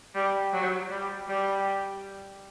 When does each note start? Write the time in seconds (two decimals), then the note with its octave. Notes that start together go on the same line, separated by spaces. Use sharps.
0.15 G3
0.52 F#3
0.90 G3
1.28 G3